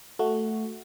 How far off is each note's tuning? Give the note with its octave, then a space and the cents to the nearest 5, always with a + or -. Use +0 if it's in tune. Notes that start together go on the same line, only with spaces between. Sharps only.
A3 +0 F#4 +0